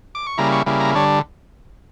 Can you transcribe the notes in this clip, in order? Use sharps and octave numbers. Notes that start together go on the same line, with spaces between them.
D6
C#6
C#3 G3 A#3 E4 A#5
C#6
C#3 G3 A#3 E4
A#5
D3 G3 D4 C#5